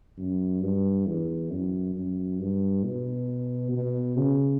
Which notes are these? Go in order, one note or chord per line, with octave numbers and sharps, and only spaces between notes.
F#2
G2
E2
F#2
F#2
G2
B2
B2
C#3